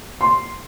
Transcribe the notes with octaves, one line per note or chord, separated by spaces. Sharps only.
C6